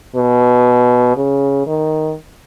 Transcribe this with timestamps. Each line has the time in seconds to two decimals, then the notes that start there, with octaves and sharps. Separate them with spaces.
0.15 B2
1.17 C#3
1.67 D#3